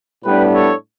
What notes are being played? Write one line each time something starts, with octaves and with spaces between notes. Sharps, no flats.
A2 G3 B3 D4 G4 B4
A4 C#5